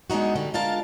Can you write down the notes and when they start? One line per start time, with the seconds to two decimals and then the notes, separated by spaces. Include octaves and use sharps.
0.10 G#3 B3 D4 D#4 F#4
0.36 D3 G3
0.54 G#3 D4 F4 A#4 F5 A5